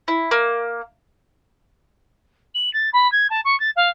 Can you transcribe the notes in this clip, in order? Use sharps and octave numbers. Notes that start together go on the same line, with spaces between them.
E4
A#3
F#7
A6
B5
G#6
A5
C#6
A6
F5